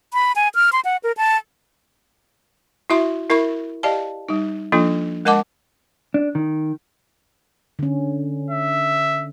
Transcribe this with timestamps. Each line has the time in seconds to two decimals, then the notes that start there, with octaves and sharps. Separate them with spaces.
0.13 B5
0.36 G#5
0.55 F6
0.73 C6
0.85 F#5
1.04 A#4
1.17 A5
2.90 E4 F#4 E5 C6
3.30 E4 A#4 E5 B5 C#6
3.83 G4 D5 D#5 F5 A5
4.29 G3 D#4
4.72 F3 A#3 D4 F4 A4
5.25 G#3 A#4 D#5 F#5 A5 D6
6.14 D4
6.35 D#3
7.79 D3 C#4
8.50 E5